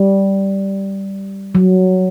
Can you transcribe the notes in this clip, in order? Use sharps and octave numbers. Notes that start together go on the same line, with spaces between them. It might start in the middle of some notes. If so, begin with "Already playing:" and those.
Already playing: G3
F#3